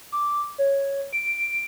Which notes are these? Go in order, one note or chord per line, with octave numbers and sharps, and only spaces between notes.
D6
C#5
D7